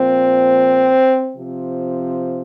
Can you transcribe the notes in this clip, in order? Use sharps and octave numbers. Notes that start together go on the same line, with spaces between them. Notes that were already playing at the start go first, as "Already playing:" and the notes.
Already playing: A#2 F3 C4
C3 F3